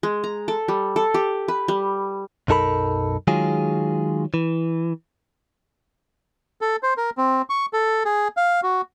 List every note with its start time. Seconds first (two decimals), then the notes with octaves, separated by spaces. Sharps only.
0.03 G#3
0.24 A#5
0.48 A4
0.68 G3
0.96 A4
1.14 G4
1.48 B4
1.68 G3
2.48 B1 F#2 D#4 A4 A#4 B5
3.27 D#3 F#3 G#3 F4 G#4
4.34 E3
6.61 A4
6.83 C5
6.98 A#4
7.18 C4
7.50 C#6
7.73 A4
8.05 G#4
8.37 F5
8.63 F#4